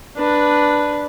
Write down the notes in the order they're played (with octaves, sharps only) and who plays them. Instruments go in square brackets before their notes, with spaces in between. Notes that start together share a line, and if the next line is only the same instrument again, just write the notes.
[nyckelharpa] D4 B4